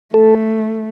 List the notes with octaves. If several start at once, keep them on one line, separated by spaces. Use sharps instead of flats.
A3 A4